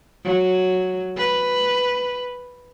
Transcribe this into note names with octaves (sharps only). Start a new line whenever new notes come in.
F#3
B4